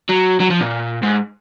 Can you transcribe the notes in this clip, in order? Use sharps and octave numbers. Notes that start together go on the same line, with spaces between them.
F#3
F#3
F3
A#2
G#2